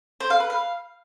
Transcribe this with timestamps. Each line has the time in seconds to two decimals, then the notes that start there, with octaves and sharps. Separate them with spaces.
0.20 C5
0.30 F5
0.40 B4
0.50 F5